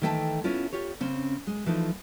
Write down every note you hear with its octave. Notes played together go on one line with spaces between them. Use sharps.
D#3 E3 A3 F#5 G5 A5
B3 C#4 E4 F4
F4 G4 C#5
C#3 C4 C#4
G#3
E3 F3 A3 D#4